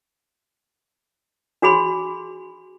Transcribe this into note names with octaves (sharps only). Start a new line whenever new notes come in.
D4 F#4 G#4 B5 C6